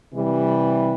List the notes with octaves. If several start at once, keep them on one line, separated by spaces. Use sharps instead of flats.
C3 E3 G3